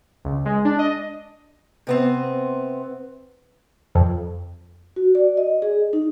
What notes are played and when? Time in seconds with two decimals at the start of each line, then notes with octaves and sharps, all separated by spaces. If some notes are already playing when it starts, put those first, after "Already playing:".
0.25 C#2
0.45 G#3
0.65 D4
0.79 D#5
1.87 C3 B3 C4
3.95 F2
4.96 F#4
5.15 D5
5.37 D#5
5.62 G#4
5.93 D#4